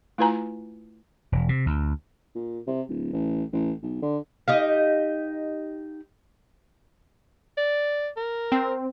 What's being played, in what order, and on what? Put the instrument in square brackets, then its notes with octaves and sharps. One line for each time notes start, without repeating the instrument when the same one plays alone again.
[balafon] A3 E4 F4 B4 G#5 A#5
[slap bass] E1
C3
D2
[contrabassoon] A#2
C3
D1
A1
A1
B1
D3
[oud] D#4 G4 F5
[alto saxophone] D5
A#4
[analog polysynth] C4